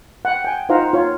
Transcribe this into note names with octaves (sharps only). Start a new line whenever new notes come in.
F#5 G5
G5 G#5
D#4 F4 C5 F5 F#5 A#5
F4 C#5